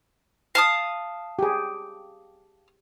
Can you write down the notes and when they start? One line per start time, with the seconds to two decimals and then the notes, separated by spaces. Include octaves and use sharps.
0.55 F5 A5 D#6
1.39 G4 G#4